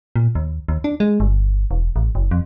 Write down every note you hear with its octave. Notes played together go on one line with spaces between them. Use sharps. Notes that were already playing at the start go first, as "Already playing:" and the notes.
A#2
D#2
D#2
D4
G#3
G1
E1
A1
F#1
F2